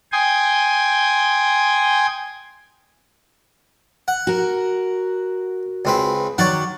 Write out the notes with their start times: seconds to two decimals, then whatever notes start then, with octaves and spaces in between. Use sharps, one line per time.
0.12 G5 G#5 C6 D#6
4.08 F#5
4.27 F#4 A#4
5.85 C#2 C4 B4
6.38 D#3 F#3 C#5 D5 F#5